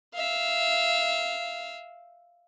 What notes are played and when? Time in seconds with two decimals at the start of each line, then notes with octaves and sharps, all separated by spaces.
0.14 E5 F5